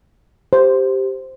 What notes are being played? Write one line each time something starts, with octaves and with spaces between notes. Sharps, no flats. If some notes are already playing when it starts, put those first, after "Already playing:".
G4 C5